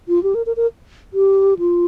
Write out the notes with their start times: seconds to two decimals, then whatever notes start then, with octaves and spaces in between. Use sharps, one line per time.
0.09 F4
0.23 G4
0.35 A#4
0.46 A#4
0.56 A#4
1.14 G4
1.59 F4